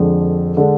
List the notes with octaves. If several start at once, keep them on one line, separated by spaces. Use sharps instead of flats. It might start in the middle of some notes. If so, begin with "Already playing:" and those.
Already playing: F2 D3 G#3 D4
D3 G#3 D4